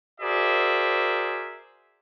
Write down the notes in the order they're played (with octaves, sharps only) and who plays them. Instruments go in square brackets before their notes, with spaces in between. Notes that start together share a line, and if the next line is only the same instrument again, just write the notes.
[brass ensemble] F#4 G#4 A#4 C5 D5 E5